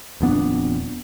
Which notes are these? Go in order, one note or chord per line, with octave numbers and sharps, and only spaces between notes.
D#1 F2 B3 D4